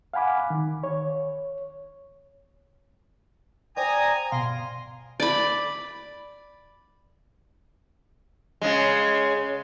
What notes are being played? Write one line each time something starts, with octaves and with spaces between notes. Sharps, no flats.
F5 F#5 G#5 B5 D6
D#3
C#5
C5 D5 G5 G#5 A#5 D#6
G1 B2 F5 C6
D5 B5
C#3 G#3